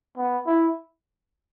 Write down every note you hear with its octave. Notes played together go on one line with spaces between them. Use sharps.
B3
E4